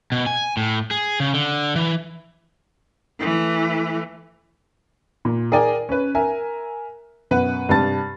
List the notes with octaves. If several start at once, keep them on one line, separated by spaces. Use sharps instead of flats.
B2
G#5
A2
G#4
C#3
D3
E3
E3 A3
A#2
G#4 A#4 D5 G5 G#5
C#4 B4
A#4 E5 G#5
F#2 B2 B4 F#5
G2 C3 G3 A5 A6